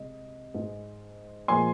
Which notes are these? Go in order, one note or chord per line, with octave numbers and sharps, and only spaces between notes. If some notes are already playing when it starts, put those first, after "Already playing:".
Already playing: C3 G#3 D#5
G#2 G#3
A#2 F3 G#3 G#5 C6